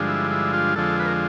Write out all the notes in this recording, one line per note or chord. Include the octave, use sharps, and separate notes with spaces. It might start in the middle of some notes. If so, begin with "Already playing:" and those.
Already playing: G2 D3 F3 G#3
E4
E4
F4
F2 D3 F3 G#3 A4
B4
A#4